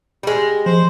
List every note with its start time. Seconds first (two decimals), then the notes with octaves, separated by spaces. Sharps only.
0.23 G3 G#3
0.66 F3 C5